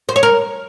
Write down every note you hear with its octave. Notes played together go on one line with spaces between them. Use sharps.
C5
C#5
A#4